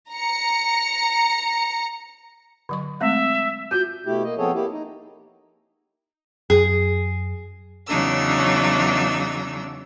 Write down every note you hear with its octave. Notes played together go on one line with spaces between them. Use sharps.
A#5 C#7
D3 F#3 C#6
G#3 A3 C4 E5
F4 F#4 G6
B2 A3 E4 G4
A#3 D#5
F3 B3 C4 G#4 A4 C#5
A#3 E4 G4
D#4
F#2 G#4
E2 C#3 F#3 D4 D#4 E6